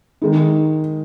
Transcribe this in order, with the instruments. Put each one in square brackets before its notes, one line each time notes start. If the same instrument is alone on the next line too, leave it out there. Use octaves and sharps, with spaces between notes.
[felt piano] D#3 G#3 D#4